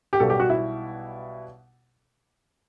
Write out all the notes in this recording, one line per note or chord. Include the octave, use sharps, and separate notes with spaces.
G4
B1 B2 G3 A4
G4
F#4
E4